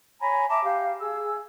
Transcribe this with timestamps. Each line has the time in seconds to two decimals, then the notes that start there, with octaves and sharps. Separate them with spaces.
0.21 C#5 G#5 A#5 B5
0.49 E5 A5 A#5 D6
0.63 G4 F5
0.99 G#4 E6